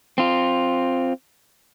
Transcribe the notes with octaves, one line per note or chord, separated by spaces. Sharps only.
C4 F4